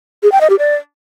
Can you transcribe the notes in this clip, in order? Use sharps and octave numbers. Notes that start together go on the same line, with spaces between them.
G#4
G5
D#5
G4
D5